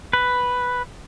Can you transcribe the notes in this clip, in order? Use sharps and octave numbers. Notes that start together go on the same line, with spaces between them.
B4